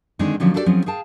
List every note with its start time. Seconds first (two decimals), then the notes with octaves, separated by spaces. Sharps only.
0.19 D3 D#3 G#3 C4 D4 D#4
0.40 D3 D#3 F3 F#3 C4 C#4
0.54 D4 F#4 G4 A4 B4 D5
0.66 F3 F#3 C4 C#4 E4 G#4
0.86 G#4 F5 G5 A5